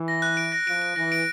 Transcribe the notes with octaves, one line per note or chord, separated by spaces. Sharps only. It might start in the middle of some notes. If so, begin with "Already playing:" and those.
Already playing: E3
A#6
F#6
D7
A#6
F3 D7
D7
E3 A#6
D7